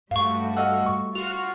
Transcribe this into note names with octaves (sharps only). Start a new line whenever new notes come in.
G2 G3 A3 F#4 F5 C#6
D#5 F5 F#5 E6
C#6
F4 F#4 F6 F7